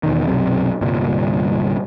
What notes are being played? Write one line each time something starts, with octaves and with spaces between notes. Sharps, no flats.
E2 B2 D#3
B1 F#2 C3
G1 C2 G2 A#2